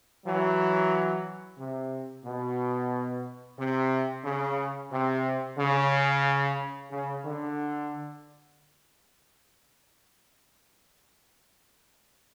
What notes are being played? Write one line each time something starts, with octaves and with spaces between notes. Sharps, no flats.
E3 F#3
C3
B2
C3
C#3
C3
C#3
C#3
D3